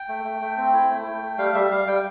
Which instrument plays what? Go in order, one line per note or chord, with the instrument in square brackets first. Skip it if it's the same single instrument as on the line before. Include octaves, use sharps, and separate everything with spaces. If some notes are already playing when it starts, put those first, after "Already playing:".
Already playing: [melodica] G5
A3
A3
A3
C4
E4
A3
A3
A3
G3 F5
G3 E5
G3 F5
G3 G5